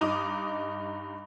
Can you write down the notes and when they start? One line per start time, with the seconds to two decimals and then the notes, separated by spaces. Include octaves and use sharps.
0.01 G2 D#4 D6 D#6